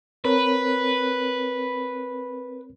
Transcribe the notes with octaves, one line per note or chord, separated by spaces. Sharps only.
C4 A#4 B4 C#5